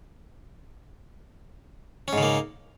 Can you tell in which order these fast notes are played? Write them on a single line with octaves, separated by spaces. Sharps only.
C#4 G#2 C#3 A#3